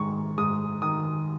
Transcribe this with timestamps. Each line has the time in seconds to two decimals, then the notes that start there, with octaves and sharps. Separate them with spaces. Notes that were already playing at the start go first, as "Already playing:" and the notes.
Already playing: G#2 D#3 C#6
0.38 G#2 D#6
0.82 D#3 D#6